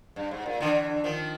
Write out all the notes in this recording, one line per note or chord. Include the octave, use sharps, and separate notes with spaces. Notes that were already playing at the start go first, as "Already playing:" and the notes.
G2
G#2
A#2
D3 E3
D#3 F3